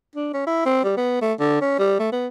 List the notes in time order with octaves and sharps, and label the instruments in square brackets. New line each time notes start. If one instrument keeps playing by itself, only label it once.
[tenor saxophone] D4
C#4
E4
C4
G3
B3
A3
D3
C#4
G3
A3
B3